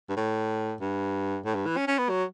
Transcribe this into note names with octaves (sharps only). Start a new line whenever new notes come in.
G2
A2
G2
A2
G2
E3
C#4
C#4
B3
F#3